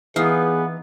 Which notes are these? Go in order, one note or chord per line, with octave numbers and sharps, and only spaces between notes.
E3 B3 D#4 G#4 F5